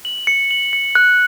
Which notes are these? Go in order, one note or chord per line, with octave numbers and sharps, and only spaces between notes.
F#7
C#7
F#7
C#7
F#6